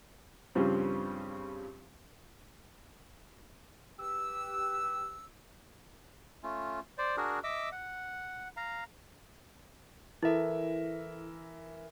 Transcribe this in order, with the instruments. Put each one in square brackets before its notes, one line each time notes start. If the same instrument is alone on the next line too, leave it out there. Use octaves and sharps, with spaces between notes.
[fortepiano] G2 C#3 F3 G3 C4
[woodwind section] G4 B4 E6
[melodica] A3 C#4 F4
C5 D5
D4 F#4 G#4 A#4
D#5 E5 D6 E6
F#5
F5 A#5
[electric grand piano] E3 A#4 E5 [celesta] E4 A4